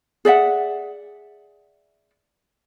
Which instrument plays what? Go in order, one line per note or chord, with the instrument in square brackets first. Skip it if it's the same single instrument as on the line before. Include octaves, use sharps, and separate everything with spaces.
[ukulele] G#4 D5 E5 F#5